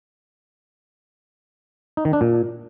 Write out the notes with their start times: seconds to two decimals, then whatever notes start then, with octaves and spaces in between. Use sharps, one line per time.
1.97 D#4
2.05 D#3
2.13 D4
2.21 A#2